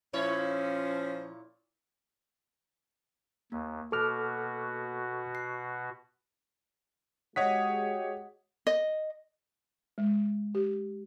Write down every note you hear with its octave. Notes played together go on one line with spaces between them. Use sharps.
A#2 F3 C#4 E4 C#5
D#2 A#3
B2 F#4 A4 D6 F6
C7
G#3 F#4 G4 C#5 D#5 F#5 D#6 B6
D#5
G#3
G4